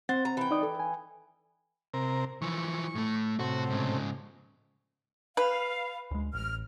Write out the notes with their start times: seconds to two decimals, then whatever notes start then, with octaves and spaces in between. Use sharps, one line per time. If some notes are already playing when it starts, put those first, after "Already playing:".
0.09 C4 C5 F#5 A6
0.25 A#5
0.37 E3 G5
0.51 D#4 D5 D#6
0.63 A4
0.80 G#5
1.94 C3 A#4
2.42 E3 F3 C#6
2.95 A2 A3
3.39 A2 C3 F#4
3.70 G#2 C#3
5.37 B4 F5
6.11 D2 G#3
6.33 A1 F6